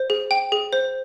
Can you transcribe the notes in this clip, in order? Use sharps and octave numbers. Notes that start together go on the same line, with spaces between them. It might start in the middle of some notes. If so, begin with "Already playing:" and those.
Already playing: C5
G#4
G5
G#4
C5